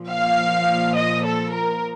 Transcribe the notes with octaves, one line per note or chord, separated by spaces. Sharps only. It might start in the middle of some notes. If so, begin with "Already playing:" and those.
Already playing: A#2 F3
F5
D#5
A4
A#4